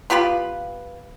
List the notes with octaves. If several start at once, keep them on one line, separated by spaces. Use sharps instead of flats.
B3 F4 G4 B4